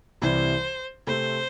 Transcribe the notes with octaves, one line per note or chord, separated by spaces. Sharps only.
C2 C3 E3 G3 E4 C5
C3 A3 C4 C5